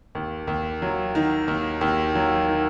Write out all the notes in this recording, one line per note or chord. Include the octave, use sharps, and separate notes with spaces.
D#2
D#2
F#3
D#3
D#2
D#2
F#3
D#3